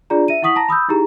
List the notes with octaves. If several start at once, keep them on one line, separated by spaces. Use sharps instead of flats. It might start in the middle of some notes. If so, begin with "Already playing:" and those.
D4 F4 G#4 D5 A#5
E5 D#7
E4 F#5 C#6 D#6 B6 F#7
A5 A#5 A#6
B5 D#6 E6 G6
D#4 E4 G4 G#4 A#5